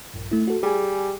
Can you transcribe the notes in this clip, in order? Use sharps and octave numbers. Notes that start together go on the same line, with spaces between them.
A#1 G2
A3 E4
F#4 A4
G3 G#4 G#5